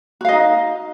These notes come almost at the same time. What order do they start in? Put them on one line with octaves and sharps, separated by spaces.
F#4 F5 D#5 D#4